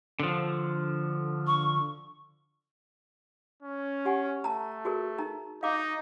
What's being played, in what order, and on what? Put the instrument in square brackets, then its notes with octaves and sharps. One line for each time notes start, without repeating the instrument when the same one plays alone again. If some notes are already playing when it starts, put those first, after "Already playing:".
[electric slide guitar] D3 F3
[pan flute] C#6
[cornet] C#4
[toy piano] G4 F#5 G#5
[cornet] A3 [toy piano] A5 A#5
[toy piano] F#4 G#4 A#4
D#4 A#5
[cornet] D#4 [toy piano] F5 D6